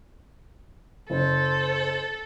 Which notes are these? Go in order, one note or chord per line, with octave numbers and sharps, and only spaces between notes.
F#1 A4 C5